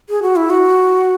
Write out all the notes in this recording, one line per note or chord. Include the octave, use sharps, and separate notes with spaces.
G#4
F#4
E4
F#4